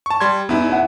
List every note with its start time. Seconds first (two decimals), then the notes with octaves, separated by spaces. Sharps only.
0.06 A5 C#6
0.20 G3 C6 G#6
0.49 E2 B3 D#4 E4
0.69 E5 F#5